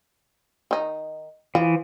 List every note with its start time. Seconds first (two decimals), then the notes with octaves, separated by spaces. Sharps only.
0.71 D#3 D#4
1.55 E3 F3